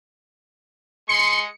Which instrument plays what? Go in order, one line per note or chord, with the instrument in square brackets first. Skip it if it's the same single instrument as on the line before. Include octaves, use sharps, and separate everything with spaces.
[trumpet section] G#3 C6 [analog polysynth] C#7